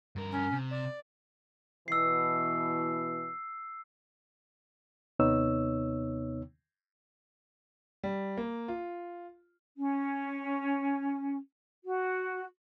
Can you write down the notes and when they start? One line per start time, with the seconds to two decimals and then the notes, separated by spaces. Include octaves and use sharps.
0.16 G2 A#4
0.31 C#4
0.52 C3
0.70 D5
1.88 B2 E3 E6 C7
5.19 D#2 C3 B3 D#4 C#5 E6
8.04 G3
8.37 A#3
8.68 F4
9.76 C#4
11.84 F#4